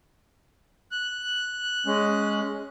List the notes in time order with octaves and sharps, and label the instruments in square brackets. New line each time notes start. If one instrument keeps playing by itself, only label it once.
[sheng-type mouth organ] F#6
[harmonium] G#3 C#4